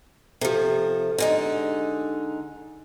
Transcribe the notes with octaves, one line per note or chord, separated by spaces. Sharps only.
C3 F3 G4 A4
D3 G#3 D#4